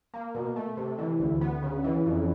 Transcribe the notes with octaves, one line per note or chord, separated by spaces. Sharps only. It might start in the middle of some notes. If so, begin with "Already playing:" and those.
A#3
B2
A3
C3
E3
D2
B3
C#3
E3
F2